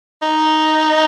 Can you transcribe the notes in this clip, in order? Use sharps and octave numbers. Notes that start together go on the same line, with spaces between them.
D#4